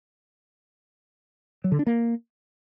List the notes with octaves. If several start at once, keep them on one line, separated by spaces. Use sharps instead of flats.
F#3
D3
D4
A#3